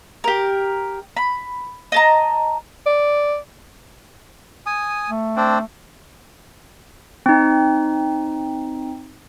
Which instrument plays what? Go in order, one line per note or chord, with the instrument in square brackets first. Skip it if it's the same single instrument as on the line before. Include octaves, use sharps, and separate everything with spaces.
[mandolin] G4 A#4
B5
D#5 A5 A#5
[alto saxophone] D5
[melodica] G#5 D#6
[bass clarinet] A3
[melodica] C4 D4
[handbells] C4 D#4